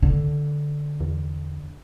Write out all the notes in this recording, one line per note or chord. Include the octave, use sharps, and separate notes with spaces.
D3
E2